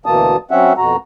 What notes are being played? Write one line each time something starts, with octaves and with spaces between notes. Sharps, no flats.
D2 B2 E3 A#3 A5 D#6
F#3 C4 C#4 E5 F#5
F2 B2 F#4 A#5